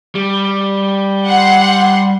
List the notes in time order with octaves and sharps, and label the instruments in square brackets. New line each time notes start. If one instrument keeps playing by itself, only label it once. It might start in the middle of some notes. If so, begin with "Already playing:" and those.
[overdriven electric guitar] G3
[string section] F#5 C6